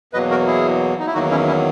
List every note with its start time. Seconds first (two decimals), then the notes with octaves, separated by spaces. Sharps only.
0.13 E2 B2 F#3 A#3 B4 D#5
0.31 F#4 A#4
0.47 E4 G#4
0.99 D#4
1.07 E4
1.14 E2 D#3 F#3 A#3 D#4 F#4
1.31 C#4 E4
1.47 C#4 E4